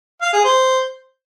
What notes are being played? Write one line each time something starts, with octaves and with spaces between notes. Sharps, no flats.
F5
G#4
C5